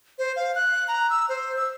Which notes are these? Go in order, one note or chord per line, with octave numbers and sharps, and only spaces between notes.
C5
F5
F#6
A#5
E6
C5
E6